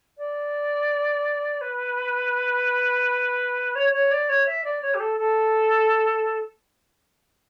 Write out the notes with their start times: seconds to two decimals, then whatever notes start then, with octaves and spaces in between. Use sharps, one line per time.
0.17 D5
1.61 B4
3.75 C#5
3.92 C#5
4.11 D5
4.29 C#5
4.46 E5
4.64 D5
4.81 C#5
4.94 G4
5.00 A4
5.18 A4